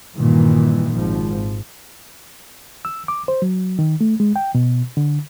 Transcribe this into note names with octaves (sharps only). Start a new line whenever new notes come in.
G2 A#2 D#3 E3
G#1 F3
E6
D6
C5
F#3
D#3
A3
G#3
G5
B2
D3